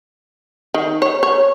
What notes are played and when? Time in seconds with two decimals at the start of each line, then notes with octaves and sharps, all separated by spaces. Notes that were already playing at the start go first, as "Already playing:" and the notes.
0.74 D#3
1.02 C#5
1.23 C#5